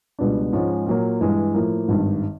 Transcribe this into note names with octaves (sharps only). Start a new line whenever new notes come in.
C#2 B2 G3 B3 D4
G#2 F3 G#3 C#4
A#2 F#3 A#3
G2 E3 G#3
A2 F3 A#3
G#1 G2 D#3